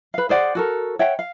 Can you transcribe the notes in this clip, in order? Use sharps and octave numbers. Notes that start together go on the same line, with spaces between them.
B4 F5
G#4 C5 D5 F#5
F#4 A4 A#4
C#5 E5 F#5 G5
F5